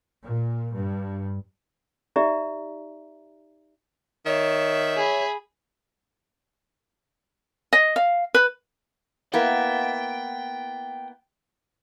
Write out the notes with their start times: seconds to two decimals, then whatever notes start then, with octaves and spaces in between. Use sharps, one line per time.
0.22 A#2
0.74 G2
2.16 D#4 G4 D5 E5 A#5
4.26 D#3 C#5 E5
4.96 G#4 B5
7.73 D#5
7.96 F5
8.34 B4
9.33 A#3 B3 E4 G5